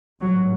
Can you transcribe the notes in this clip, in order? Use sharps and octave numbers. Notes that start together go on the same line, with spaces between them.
A1 G#2 F#3